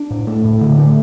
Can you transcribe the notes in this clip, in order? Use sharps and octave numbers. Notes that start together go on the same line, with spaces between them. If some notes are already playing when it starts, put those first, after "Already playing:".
Already playing: D4
A2
A3
A2
D3
A3